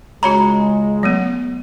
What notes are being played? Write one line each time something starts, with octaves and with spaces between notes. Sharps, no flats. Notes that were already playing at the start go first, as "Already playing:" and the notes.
C#2 G#3 F#4 C#5 A#5 B5
F#3 A3 B3